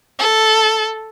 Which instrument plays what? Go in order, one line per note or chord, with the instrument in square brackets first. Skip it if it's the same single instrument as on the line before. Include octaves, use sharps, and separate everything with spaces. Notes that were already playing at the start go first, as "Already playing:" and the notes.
[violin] A4